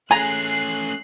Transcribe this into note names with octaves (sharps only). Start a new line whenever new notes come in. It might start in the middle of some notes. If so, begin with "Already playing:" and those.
A3 C#4 G#4 G#5 A#5 F#6 C7